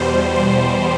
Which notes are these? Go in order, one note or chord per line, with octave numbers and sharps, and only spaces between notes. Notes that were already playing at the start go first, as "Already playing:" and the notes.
Already playing: E2 B2 G3 C5
C5